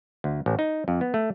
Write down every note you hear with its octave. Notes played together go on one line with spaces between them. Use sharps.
D2
A1
D#4
F2
B3
A3